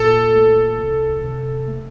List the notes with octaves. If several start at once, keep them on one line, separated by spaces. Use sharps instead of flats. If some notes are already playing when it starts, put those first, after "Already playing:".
Already playing: A#2 A4
A3
C2
C3
A3